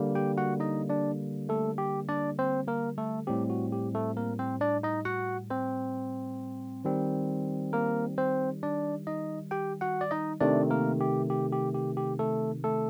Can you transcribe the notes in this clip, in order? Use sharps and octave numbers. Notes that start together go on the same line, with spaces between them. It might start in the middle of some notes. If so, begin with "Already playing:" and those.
Already playing: D3 G3 A#3
G4 G5
F#4 F#5
D#4 D#5
D4 D5
A3 A4
G4
D4 D5
C4 C5
A#3 A#4
A3 A4
A2 G3 C4 G4
F#4
G4
A3 A4
A#3 A#4
C4 C5
D4 D5
D#4 D#5
F#4 F#5
C4 C5
D#3 G3 C4
A#3 A#4
C4 C5
D4 D5
D#4 D#5
G4 G5
F#4 F#5
D5
D#4 D#5
C3 D#3 A3 D4 D5
A#3 A#4
G4
G4
G4
G4
G4
A3 A4
A3 A4